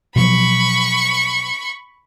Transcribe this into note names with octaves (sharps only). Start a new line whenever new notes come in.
B2 F3 F#3 B5 C#6